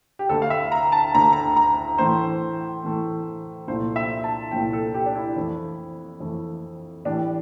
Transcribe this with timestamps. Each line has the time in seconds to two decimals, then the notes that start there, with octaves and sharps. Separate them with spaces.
0.19 G4
0.29 D2 D3 A3 A4
0.42 F5
0.50 E5
0.72 A#5
0.92 A5
1.14 D2 D3 A3 A#5
1.33 A#5
1.56 A#5
1.98 A2 E3 A3 C5
2.83 A2 E3 A3
3.67 C2 A#2 F3 A3 C5
3.96 E5
4.24 A5
4.51 C2 A#2 F3 A3 G5
4.73 A4
4.94 G4
5.06 D4
5.16 E4
5.36 F2 E3 A3
6.20 F2 E3 A3
7.05 A2 E3 G3 D4